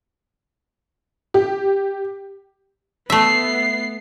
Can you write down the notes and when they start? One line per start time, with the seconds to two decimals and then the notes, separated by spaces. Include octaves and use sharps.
1.34 G4
3.10 A3 B3 E5 C7